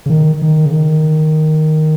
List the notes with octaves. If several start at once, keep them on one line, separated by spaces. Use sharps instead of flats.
C#3
D#3
D#3
C#3
D#3